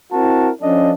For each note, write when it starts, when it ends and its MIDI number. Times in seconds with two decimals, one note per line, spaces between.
0.12 0.50 60
0.12 0.50 64
0.12 0.50 66
0.12 0.50 70
0.12 0.50 81
0.61 0.92 53
0.61 0.92 61
0.61 0.92 62
0.61 0.92 69
0.61 0.92 75